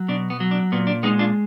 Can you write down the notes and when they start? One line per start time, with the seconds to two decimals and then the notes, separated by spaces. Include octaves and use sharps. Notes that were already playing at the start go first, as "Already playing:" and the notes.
Already playing: F#3
0.08 B2 D4
0.30 B3
0.40 F#3
0.51 D4
0.72 A#2 B3
0.87 D4
1.03 G#3 B3 D#4
1.19 D4 F4